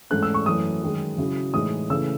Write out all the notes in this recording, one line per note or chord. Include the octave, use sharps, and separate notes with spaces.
G#2 E3 A3 C#4 F#6
E6
C#6
F#2 E3 A3 D#6
F#2 D#3 G#3
C#3 F#3 C#4 E4
A2 E3 G#3 D#4 D#6
C#3 E3 A3 E6